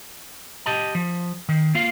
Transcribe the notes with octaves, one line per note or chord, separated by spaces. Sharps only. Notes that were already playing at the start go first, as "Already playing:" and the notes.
G4 D#5 A5
F3
D#3
A#3 F4 F5